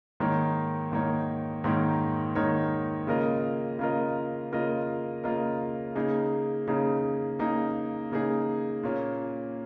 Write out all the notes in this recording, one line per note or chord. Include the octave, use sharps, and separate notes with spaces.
G#2 D#3 A#3 D#4 C#5
G#2 D#3 A#3 D#4 C#5
G#2 D#3 A#3 D#4 C#5
G#2 D#3 A#3 D#4 C#5
C#3 A#3 F4 A#4 D#5
C#3 A#3 F4 A#4 D#5
C#3 A#3 F4 A#4 D#5
C#3 A#3 F4 A#4 D#5
C#3 A#3 D#4 G#4
C#3 A#3 D#4 G#4
C#3 A#3 D#4 G#4
C#3 A#3 D#4 G#4
A#2 A#3 C#4